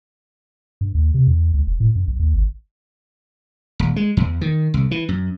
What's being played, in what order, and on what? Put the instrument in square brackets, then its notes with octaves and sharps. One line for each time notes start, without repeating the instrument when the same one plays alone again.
[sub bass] G2
D#2
C3
E2
C#2
E1
A2
F#2
B1
D#2
G#1
[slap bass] D#1
G#3
E2
D#3
C2
E3
F#2